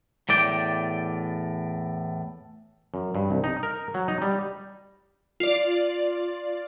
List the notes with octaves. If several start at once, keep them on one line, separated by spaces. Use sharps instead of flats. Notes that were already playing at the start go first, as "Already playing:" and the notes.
E2 A2 D5 G5
F#2
G2
C2
D#4
A#4
F#3
D#4
G3
F4 D5